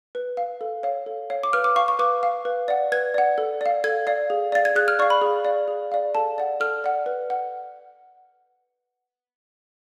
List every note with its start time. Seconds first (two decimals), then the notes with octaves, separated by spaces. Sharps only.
0.15 B4
0.37 F5
0.61 A4
0.83 C#5 F5
1.06 A4
1.30 C#5 F5
1.43 D6
1.53 B4 F6
1.64 D6
1.76 F5 C#6
1.88 C#6
1.99 B4 D6
2.23 F5
2.45 B4
2.68 D5 F#5
2.92 B4 G#6
3.14 D5 F#5
3.38 A4
3.61 D5 F5
3.84 A4 G#6
4.07 D5 F5
4.30 G#4
4.52 D5 F5 A6
4.65 G#6
4.76 G#4 F#6
4.88 F6
4.99 D5 C#6
5.02 F5
5.10 B5
5.22 G#4
5.45 D5 F5
5.68 G#4
5.92 D5 F5
6.15 A4 A5
6.38 D5 F#5
6.60 A4 F6
6.84 D5 F#5
7.06 B4
7.30 F#5